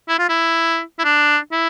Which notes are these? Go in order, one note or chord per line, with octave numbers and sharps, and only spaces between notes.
E4
F4
E4
E4
D4
E4